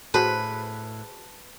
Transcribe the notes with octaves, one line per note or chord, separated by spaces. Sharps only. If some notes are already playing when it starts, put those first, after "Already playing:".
A2 F#4 G#4 B4 C5 A5